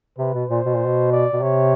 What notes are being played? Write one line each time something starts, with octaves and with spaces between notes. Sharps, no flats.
C3 B4
B2
A#2 C5
B2
A#2
B2
D5
B2
C3 C#5